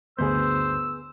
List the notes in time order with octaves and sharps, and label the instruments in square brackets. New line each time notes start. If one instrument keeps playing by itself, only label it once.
[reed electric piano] D2 G2 G6 [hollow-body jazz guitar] B3 G#4 [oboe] C5 [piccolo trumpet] E6